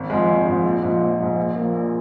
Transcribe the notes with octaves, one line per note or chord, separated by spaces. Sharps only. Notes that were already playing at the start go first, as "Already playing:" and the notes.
Already playing: G#1
G#2 F3 G#3
G#1
G#2 F3 G#3
A#1
G#2 F3 G#3
A#1
G#2 F3 G#3
A#1
A#2 F3 A#3
A#1